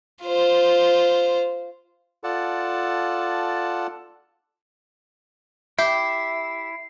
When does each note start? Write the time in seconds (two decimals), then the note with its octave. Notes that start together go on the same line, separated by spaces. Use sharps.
0.23 F4 C5
2.24 F4 A4 D5 F#5 A5
5.79 E4 G4 E5 C7